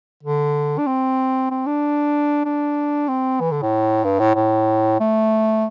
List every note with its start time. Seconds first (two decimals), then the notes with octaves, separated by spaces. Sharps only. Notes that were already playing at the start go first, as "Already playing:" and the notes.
0.23 D3
0.78 D4
0.87 C4
1.51 C4
1.67 D4
2.45 D4
3.09 C4
3.40 E3
3.51 D3
3.63 A2
4.04 G2
4.20 A2
4.35 A2
5.00 A3